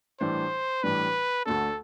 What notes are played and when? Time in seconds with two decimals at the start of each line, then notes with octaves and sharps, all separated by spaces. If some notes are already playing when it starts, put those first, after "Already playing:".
0.20 A2 E3 G3 D4 C5
0.83 A2 E3 G3 D4 B4
1.46 D2 D3 A3 D4 A4